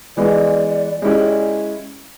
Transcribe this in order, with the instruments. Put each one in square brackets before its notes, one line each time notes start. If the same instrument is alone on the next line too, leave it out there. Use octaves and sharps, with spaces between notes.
[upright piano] E3 G#3 B3 [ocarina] D5
[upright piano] G#3 C#4 E4 G4